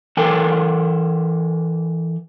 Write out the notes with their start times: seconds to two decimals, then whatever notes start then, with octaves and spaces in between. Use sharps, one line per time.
0.17 E3 A4 A#4 G5 G#5